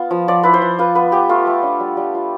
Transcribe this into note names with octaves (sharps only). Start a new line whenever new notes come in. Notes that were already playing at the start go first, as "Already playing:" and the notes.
Already playing: B3 F4
F3
F3 D5
E4 B4
C5
F3
F4 B4
B3 B4
B3 G4
A3 F4
A3
D4
G3
G3
F4